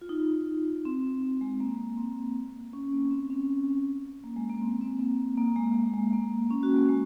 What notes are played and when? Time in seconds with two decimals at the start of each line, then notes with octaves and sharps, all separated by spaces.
0.01 F4
0.09 D#4
0.85 C4
1.22 C4
1.41 G#3
1.60 A#3
1.97 C4
2.73 C#4
2.93 A#3
3.11 C4
3.30 C#4
4.24 A#3
4.36 G#3
4.49 A#3
4.61 C4
4.81 C4
4.99 A#3
5.37 A#3
5.56 G#3
5.75 A#3
5.94 G#3
6.13 A#3
6.51 C#4
6.63 F#4
6.76 A#3
6.89 G#3